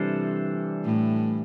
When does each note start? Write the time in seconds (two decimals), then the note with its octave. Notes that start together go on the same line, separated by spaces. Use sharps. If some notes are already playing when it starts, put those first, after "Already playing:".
Already playing: C3 E3 G3 D4 A4 C5
0.84 A2